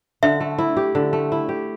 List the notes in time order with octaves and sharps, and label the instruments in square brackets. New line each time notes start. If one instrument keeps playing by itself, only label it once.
[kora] D3 [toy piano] E5
[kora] A3
E4
G4
D3
A3
E4
G4